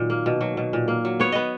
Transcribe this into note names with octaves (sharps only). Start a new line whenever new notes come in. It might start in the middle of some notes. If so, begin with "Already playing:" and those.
Already playing: A#2 D#3 F#3
A#3
B2
F#3
B2
A#2
A#3
F#3
B3 C#5
B3 D#5